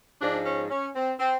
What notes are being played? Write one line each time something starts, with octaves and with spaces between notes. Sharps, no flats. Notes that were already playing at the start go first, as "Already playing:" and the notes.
G#2 F3 G#3 D4
C#4
C#4
C4
C4